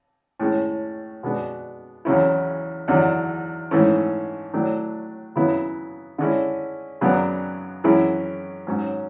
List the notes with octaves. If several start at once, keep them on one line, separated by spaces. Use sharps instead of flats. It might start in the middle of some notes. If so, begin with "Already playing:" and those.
A2 G#3 C#4
B2 G#3 B3 D4
E2 C#3 F#3 C#4 E4
E2 D3 F#3
G#2 E3 A3 C#4
A2 F#3 A3 D4
C#3 F#3 B3 E4
D3 G#3 C#4 E4
F#2 C#3 F#3 B3 D4
F#2 E3 G#3 C#4 E4
G#2 F#3 C#4